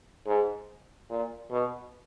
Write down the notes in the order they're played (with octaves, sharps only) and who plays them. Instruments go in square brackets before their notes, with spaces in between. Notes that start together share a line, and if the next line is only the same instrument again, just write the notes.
[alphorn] G#2
A#2
B2